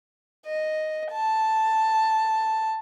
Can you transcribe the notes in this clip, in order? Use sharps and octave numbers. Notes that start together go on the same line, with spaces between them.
D#5
A5